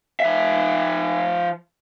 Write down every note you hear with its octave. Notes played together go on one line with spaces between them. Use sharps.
F3 E5